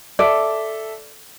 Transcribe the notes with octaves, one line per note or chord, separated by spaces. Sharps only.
A4 D5 E5